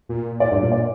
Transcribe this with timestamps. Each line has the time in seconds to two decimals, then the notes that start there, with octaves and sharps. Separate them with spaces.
0.09 A#2
0.40 A2 D5
0.51 G2
0.62 A#2
0.72 D5